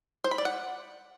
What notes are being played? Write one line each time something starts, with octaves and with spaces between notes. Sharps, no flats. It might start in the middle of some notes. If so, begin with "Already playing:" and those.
C5
B5
D5
F#5